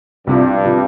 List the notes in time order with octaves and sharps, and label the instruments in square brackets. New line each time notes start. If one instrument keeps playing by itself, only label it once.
[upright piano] C2 C3 F3 [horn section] G2
[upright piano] C3 F3